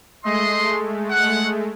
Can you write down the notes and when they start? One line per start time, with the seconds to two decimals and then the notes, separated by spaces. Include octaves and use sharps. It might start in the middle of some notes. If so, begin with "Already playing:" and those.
0.25 G#3 A3 D#5 C6
1.11 F#5